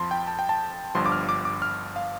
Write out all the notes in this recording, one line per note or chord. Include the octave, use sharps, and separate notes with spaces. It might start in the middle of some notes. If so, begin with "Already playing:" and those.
Already playing: F2 F3 A5 C6
G5
A5
G5
A5
G1 G2 F3 C6
D6
F6
D6
D6
F6
F5